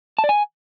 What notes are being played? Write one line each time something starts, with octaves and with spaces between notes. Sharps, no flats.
A5
D5
G#5